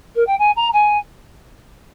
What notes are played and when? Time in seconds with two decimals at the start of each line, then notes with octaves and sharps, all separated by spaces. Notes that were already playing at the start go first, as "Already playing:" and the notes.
0.15 A#4
0.26 G5
0.38 G#5
0.56 A#5
0.73 G#5